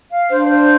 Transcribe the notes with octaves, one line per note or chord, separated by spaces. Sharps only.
F5
D4 C5
C5